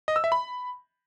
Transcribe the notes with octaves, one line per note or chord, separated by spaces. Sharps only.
D#5
E6
E5
B5